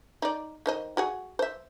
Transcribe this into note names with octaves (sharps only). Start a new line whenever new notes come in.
D#4 D5
D#3 C5 D#5
F#4 G#4 F#5
C5 E5